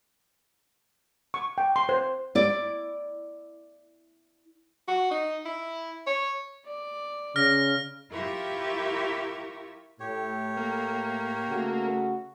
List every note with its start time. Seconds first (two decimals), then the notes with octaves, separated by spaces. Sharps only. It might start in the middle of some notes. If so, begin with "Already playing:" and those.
1.34 C#6
1.58 G5
1.76 C6
1.89 C5
2.35 E4 D5
4.88 F#4
5.11 D#4
5.45 E4
6.07 C#5
6.65 D5
7.36 C#3 F6 A#6
8.11 E4 F4 G4 A#4 E5 C#6
10.00 A2 G4 C#5
10.57 A#3
11.48 C#3 A3 F#4